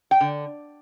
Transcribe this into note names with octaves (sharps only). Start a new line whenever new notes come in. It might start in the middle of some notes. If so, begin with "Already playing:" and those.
G5
D3